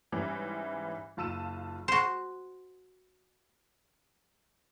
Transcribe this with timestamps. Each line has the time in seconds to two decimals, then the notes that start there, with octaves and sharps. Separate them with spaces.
0.12 G#2 E3 G3 C#4 E4 E5
1.17 F#1 F4 A5 E6 D#7 E7
1.88 F#4 C5